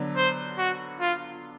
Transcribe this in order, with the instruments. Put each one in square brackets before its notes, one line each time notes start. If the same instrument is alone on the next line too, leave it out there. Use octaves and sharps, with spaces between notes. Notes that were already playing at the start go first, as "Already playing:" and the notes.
Already playing: [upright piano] D3 F#3 B3 D4
[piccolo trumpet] C5
F#4
F4